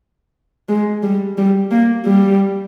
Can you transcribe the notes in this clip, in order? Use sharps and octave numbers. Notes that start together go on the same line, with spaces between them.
G#3
G3
G3
A#3
G3